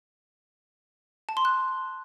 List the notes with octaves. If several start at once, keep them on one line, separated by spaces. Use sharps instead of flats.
A5
C6
F#6